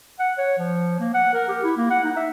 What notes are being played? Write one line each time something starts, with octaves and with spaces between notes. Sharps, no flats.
F#5
C#5
F3
A#3
F#5
A#4
G4
E4
A#3
F#5
D#4
E5